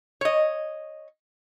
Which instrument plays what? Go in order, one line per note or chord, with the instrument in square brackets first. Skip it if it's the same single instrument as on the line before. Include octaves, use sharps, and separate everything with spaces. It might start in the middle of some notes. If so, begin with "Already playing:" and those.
[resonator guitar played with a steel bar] C#5 D#5